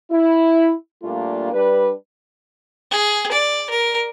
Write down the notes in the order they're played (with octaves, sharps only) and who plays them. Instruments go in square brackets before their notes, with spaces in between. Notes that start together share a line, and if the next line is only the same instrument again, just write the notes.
[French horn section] E4
A#2 G3 A3 A#3 D4 F4
G3 D4 B4
[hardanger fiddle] G#4
D5
A#4